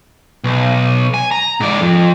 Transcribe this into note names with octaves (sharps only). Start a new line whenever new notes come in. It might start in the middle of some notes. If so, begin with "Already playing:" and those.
B1
G#5
A#5
G#2 D5
F2